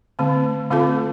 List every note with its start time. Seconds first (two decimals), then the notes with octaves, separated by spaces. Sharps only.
0.19 D3 A3 C4
0.71 D3 A3 C4 F4 A4